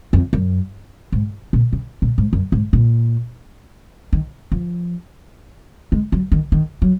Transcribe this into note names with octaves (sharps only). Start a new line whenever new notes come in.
F2
F#2
G#2
A#2
C#3
A#2
G#2
F#2
G#2
A#2
D#3
F3
G#3
F#3
D#3
D#3
F#3